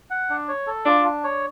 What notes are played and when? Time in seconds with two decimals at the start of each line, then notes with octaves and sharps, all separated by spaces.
0.10 F#5
0.30 D4
0.48 C#5
0.67 A4
0.85 D4 F4
1.04 D4
1.24 C#5